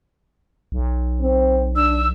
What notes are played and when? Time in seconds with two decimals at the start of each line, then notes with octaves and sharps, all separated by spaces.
0.72 B1
1.21 C4
1.76 D4 E6